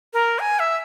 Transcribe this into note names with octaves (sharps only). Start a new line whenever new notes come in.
A#4
G#5
E5